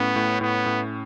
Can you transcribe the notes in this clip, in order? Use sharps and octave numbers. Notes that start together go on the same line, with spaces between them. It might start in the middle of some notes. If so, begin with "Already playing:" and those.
Already playing: A2 B3 C#4
A2
A2 B3
A2